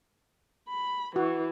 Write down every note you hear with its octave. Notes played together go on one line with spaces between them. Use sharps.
B5
E3 F#4